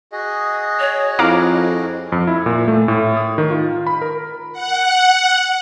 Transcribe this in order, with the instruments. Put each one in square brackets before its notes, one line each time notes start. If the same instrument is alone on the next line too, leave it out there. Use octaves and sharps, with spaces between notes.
[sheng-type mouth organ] F#4 G#4 D#5
[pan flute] C#5
[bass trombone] F2 [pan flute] E4 [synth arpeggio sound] F5 A#5 D6
[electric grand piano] F2
E4
A#2
A3
A2
D#6
D#3
F4
B5
A#4
[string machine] F#5